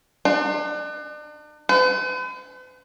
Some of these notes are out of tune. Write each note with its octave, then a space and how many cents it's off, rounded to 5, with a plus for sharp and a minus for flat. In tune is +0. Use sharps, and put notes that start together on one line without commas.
D4 +40
B4 +45